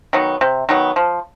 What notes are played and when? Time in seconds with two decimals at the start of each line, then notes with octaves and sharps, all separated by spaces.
0.13 D#3 F#3 B3
0.41 C3
0.69 D#3 F#3 B3
0.96 F3